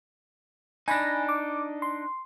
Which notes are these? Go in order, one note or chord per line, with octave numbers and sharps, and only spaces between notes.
D4 D#4 G#5 B5 A#6
D6
C6